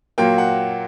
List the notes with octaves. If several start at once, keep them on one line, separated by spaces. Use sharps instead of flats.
A#2 F#3 A#3 G5
F#5